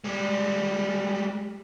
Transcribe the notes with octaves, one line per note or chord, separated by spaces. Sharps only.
G3 G#3